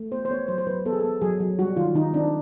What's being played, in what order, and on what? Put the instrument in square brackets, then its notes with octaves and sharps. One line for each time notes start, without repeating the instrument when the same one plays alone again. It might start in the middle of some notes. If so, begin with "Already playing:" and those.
Already playing: [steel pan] A3
B3 C5
C5
B3 C#5
F#3 C5
C5
F#3 B4
B3 A4
G#4
B3 A4
F#3 G#4
F#3
G3 F#4
D#3 F4
D#3 D#4
C4 D4